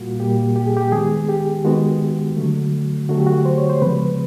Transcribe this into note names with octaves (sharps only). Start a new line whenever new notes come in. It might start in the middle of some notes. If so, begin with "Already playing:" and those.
Already playing: A#2 G3 A#3 F4 F#4
A#2 G3 A#3 G4
G4
G#4
G4
D#3 G#3 B3 G#4
G4
D#3 G#3 B3 F#4
D3 F#3 A3
D3 F#3 A3 F#4
G4
F#4
C5
C#5
C5
C#3 F3 G#3 B3 B4